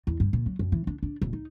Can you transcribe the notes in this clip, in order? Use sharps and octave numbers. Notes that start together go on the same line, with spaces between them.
E2
G2
A#2
F#3
F#2
E3
D4
D4
D#1
D#4